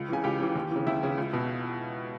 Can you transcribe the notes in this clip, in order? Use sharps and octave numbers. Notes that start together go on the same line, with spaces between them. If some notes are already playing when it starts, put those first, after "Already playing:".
Already playing: C#2
C#3 E3 G#5
C#2 G4 G5
C#3 E3
D#2
E3
C#3
D#2 E4 E5
C#3 E3
C#2
B2